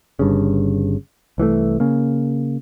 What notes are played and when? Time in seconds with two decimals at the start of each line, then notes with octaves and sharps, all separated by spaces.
0.19 G1 G2 C#3
1.38 C2 E3 F3 A3
1.80 C#3 A#3